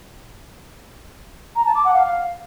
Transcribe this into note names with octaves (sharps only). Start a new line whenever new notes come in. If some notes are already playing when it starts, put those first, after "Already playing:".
A#5
A5
D6
F#5
F5